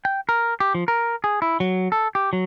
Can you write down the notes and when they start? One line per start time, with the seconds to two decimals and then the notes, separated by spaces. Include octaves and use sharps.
0.05 G5
0.29 A#4
0.60 G4
0.75 F3
0.88 A#4
1.24 G#4
1.42 E4
1.60 F#3
1.92 A4
2.15 G4
2.33 F#3